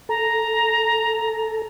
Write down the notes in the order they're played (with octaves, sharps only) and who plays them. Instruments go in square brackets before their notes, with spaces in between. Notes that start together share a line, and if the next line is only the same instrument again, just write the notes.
[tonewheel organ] A4 [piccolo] A#5